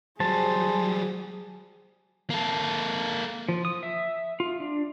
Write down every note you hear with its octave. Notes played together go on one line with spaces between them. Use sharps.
F#3 G3 G#4 C5 A5
A#3 A4
F3
D#6
E5
F4
D4